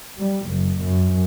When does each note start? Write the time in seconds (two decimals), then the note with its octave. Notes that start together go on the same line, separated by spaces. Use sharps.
0.19 G3
0.51 F#1
0.83 F#2